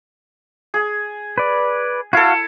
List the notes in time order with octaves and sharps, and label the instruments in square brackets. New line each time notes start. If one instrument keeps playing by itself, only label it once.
[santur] G#4
[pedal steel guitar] B4 D5
[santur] E4 A4 [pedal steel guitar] F#4 F5